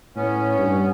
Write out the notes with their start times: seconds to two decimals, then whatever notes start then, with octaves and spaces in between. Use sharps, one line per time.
0.16 A2 B3 C#4
0.58 G2